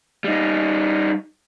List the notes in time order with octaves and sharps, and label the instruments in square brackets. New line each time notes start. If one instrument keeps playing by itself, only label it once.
[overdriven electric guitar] G3 D#4